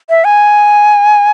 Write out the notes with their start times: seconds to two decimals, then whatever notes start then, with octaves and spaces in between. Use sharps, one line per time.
0.10 E5
0.24 G#5